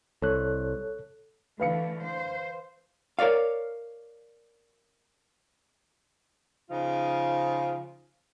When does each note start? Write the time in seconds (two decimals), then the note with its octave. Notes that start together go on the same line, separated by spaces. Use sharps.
0.22 C2 A4 C#5 F#6
1.60 D3 E3 A3 B4 F5 C#7
2.05 C5
3.19 A#4 C#5 D5 F5
6.69 C#3 F3 D#4 F4